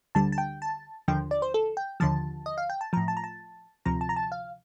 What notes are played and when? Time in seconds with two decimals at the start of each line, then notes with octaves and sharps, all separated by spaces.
0.15 D2 D3 G3 A5
0.32 A5
0.38 G5
0.62 A5
1.08 D#2 D3 F3 G5
1.31 D5
1.42 C5
1.54 A4
1.77 G5
2.00 D#2 D3 F3 A5
2.46 D#5
2.58 F5
2.70 G5
2.81 A5
2.93 A2 F3 A#5
3.08 A5
3.17 A#5
3.24 A5
3.85 D2 C3 F3 A#5
4.01 A5
4.09 A#5
4.16 A5
4.32 F5